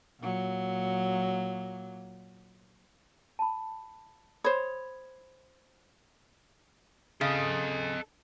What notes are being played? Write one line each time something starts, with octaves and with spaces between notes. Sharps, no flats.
A#2 F#3
A5 B5
C5 C#5 B5 D#6
C#3 A4 D#5